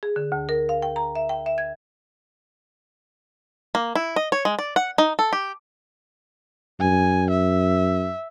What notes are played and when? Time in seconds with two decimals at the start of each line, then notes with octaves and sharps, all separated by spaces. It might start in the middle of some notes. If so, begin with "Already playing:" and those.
0.03 G#4
0.16 D3
0.32 D2
0.49 A#4
0.69 F5
0.82 G5
0.96 A#5
1.15 E5
1.29 G5
1.46 E5
1.58 G#6
3.75 A#3
3.95 E4
4.16 D#5
4.32 C#5
4.45 G#3
4.59 D5
4.76 F#5
4.98 D#4
5.19 A4
5.33 G4
6.80 F#2 G#5
7.31 E5